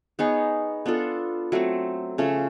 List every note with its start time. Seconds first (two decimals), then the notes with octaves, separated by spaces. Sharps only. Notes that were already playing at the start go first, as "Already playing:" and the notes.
0.19 B3 D#4 G#4 C#5
0.86 B3 D4 F4 A4
1.52 F#3 A3 C4
2.18 C#3 F3 A3 C#4